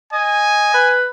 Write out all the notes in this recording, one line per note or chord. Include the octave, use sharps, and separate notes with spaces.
D#5 G#5
B4